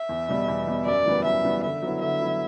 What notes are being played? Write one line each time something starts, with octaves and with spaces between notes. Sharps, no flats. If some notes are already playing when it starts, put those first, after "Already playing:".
Already playing: E5
E2
B2 G3 B3
E2
B2 G3 B3
F#2 D5
E3 G3 B3
F#2 E5
E3 G3 B3
D3 E5
F#3 B3 E4
D3 E5
F#3 B3 E4